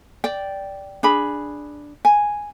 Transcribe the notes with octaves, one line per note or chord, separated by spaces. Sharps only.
D5 G5
D4 G#4 B5
G#5